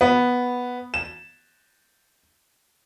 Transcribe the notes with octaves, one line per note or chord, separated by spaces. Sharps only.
B3
E7